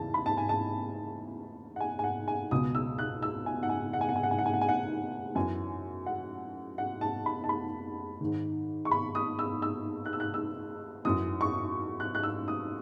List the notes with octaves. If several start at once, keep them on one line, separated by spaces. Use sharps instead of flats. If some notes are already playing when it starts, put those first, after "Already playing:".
Already playing: E2 C#3 E3 A5
B5
A5
G#5
A5
F#5
G#5
G#5
F#5
G#5
C#2 B2 D#6
E6
F#6
E6
G#5
F#5
G#5
F#5
G#5
F#5
G#5
F#5
G#5
F#5
G#5
F#5
G#5
F#5
F#2 E3 G#5
F#5
F#5
A5
B5
A5
B5
G#2 D#3
C#6
B5
D#6
E6
E6
F#6
E6
F#6
E6
F#2 E3 D#6
C#6
F#6
F#6
E6
D#6